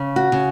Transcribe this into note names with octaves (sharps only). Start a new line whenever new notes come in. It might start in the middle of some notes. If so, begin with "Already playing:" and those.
Already playing: C#3
F#4
C#3